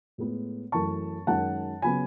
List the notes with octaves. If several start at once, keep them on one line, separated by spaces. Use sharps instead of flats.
A2 G#3 B3
F#2 E3 A3 C#4 A5 C#6
F#2 D#3 G#3 C#4 F#5 A5
C#3 F#3 B3 G#5 B5